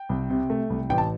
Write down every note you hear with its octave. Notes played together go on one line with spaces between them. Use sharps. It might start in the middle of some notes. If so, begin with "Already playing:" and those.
Already playing: G5
C2
C3
A3
C2
A1 G5
A5